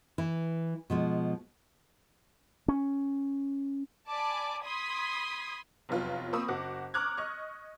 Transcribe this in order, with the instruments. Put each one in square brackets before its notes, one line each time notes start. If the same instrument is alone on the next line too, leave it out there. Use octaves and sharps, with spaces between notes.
[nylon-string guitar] E3 E4
B2 F3 G#3
[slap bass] C#4
[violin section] D5 G#5 A5 B5 D6
B5 C6 D#6 G#6 B6
[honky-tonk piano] F1 E2 F#3 F4 B4
A#3 C4 B5 C#6 D#6 E6
F#1 F#4 F#5 D6
A#5 C#6 D6 F6 F#6 G#6
D#5 C#6 F6